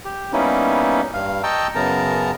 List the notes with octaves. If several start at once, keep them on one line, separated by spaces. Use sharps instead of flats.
G4
G3 A#3 B3 C#4 D#4 E4
G2 F5
D#5 G5 A5 A#5 C#6 E6
F#2 C#3 B3 A#4 A5 A#5